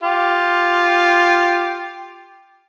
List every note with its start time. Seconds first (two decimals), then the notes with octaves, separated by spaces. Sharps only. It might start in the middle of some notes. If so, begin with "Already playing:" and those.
0.03 F4 G4